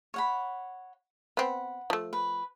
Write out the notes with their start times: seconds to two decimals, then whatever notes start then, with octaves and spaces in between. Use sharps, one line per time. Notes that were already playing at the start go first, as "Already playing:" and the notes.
0.14 C#5 F#5 B5
1.37 B3 C4 F#5 B5
1.90 F3 A3
2.13 B4